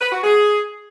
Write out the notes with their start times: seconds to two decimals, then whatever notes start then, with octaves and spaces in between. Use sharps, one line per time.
0.01 B4
0.12 F#4
0.24 G#4